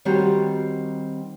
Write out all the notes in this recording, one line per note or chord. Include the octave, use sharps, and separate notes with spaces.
D#3 G3 C4 F#4 G4 C#5